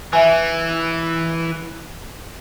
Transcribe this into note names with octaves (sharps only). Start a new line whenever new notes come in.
E3 E5 G#5